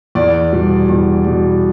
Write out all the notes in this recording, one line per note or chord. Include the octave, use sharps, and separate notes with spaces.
E2 D5
B2 G3
E2
B2 G3